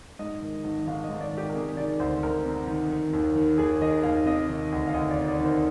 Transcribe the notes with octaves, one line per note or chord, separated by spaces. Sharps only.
G#2 D#5
D#3
G#1
G#1 F5
G#2 D#5
D5
D#3
G4
A#4
C3 G#4
D#3 D5
D2 C5
D2 A#4
C3
D#3
D#3
D#2
D#3
D#2 G#4
D#3 D#5
D#2 F5
C3 D#5
D#3
D2
F5
D2 D#5
D5
C3
D5
D#3 C5